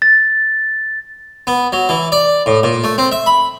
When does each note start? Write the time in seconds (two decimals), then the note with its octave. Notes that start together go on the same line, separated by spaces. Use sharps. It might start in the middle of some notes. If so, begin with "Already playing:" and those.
0.02 A6
1.47 B3
1.73 F#3
1.89 E3
2.12 D5
2.46 A2
2.63 A#2
2.84 A3
2.98 C4
3.12 E5
3.26 B5